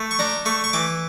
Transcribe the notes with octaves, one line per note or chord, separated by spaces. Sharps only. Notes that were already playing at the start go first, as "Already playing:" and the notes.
Already playing: A3
C#6
D4 A#5
A3 C#6
C#6
E3 D6